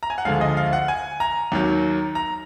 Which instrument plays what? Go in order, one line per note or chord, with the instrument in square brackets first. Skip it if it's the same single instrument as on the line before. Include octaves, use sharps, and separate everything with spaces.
[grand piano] A#5
G#5
F#5
D2 D3 F3 G#3 F5
D#5
F5
F#5
G#5
A#5
D#2 D#3 F#3
A#5